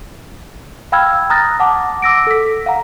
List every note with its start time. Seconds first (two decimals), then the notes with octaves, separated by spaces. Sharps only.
0.92 F5 G5 B5 E6 F6 G#6
1.30 A#5 D#6 F6 F#6 A6 A#6
1.60 F#5 A5 D6
2.02 D6 E6 A#6 D7
2.27 A4 B6
2.66 F5 F#5 A#5